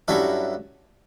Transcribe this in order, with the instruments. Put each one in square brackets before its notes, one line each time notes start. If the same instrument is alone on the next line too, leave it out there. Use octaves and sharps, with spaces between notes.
[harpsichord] G2 F#3 C#4 E4 A4